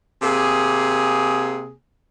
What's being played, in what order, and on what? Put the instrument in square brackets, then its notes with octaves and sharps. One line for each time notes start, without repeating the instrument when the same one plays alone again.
[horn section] C3 A#3 G#4